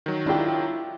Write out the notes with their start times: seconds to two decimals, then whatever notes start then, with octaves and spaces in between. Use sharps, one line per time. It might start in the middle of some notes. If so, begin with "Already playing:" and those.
0.06 D#3 F#3
0.26 D4 E4 F4 G4 G5